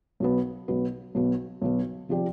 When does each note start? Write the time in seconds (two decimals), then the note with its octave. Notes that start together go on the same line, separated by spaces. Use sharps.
0.20 B1 B2 B3
0.68 B1 B2 B3
1.15 B1 B2 B3
1.62 B1 B2 B3
2.09 C3 F3 C4 G4 D5